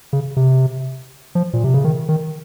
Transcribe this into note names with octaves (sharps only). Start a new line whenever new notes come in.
C#3
C3
F3
A#2
C3
C#3
D#3
D#3